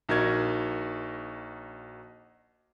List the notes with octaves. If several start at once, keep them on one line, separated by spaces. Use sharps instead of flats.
A#1 D#4 F#4 A#4 G#6